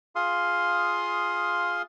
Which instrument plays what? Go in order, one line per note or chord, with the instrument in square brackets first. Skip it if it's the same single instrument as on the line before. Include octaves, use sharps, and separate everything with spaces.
[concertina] F4 G#4 F5 C6 D#6